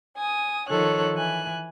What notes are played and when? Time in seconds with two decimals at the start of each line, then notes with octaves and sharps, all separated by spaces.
0.17 G#5 D#6
0.69 D#3 F3 A4 C#5 F#6
1.15 E3 G#5 F#6